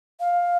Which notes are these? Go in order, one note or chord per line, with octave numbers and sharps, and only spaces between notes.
F5